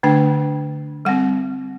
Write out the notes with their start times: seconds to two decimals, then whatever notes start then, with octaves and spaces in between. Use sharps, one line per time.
0.03 D3 A3 D4 G5
1.05 G3 C4 F#5